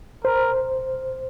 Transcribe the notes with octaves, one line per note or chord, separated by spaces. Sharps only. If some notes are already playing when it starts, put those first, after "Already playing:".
A#4 C5